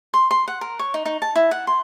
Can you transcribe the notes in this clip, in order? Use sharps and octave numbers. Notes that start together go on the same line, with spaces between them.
C6
C6
F#5
A#4
C#5
D#4
D#4
A5
E4
F#5
C6